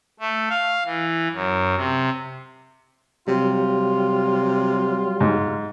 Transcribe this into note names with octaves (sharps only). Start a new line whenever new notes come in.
A3
F5
E3
F#2
C3
C3 F#3 G3 F4
G#2